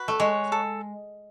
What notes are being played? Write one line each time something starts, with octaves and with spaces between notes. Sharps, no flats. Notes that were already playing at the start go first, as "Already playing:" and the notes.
Already playing: F#4 B4
A3
G#3 C#5
A4